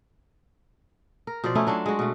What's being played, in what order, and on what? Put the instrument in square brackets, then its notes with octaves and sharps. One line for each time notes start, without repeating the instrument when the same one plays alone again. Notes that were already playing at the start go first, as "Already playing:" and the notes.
[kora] A#4
B2 F3 C5 D5
A3 C#4 D#4 E4
F#3 D4 F4 F5
G#3 F#4
B2 A3